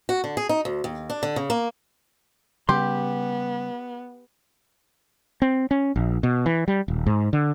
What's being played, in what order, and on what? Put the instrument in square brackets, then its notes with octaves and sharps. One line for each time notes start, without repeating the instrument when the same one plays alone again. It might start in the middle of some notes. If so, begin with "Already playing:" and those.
[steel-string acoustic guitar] F#4
D3
G#4
D#4
D2
D#2
D4
D3
C#3
A#3
[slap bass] C#3 G3 [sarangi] B3 [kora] G4 [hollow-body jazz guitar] C6
[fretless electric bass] C4
C#4
A#1
B2
E3
G3
D#1
G#2
D3